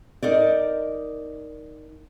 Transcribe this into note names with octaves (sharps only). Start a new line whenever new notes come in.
D#4 A#4 D5